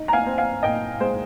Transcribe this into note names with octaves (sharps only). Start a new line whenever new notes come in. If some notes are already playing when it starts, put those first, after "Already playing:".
Already playing: D#4
A#5
F5 G#5
C4
F5 G#5
A#2 D#5 G5
G#3 C5